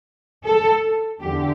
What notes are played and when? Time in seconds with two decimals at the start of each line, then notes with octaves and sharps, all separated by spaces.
0.45 A4
1.20 E2 D3 G4